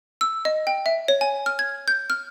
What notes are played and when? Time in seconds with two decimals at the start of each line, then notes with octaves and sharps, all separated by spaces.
0.21 E6
0.45 D#5
0.67 G5
0.86 E5
1.08 C#5
1.21 G#5
1.46 F6
1.59 G#6
1.88 G6
2.10 F6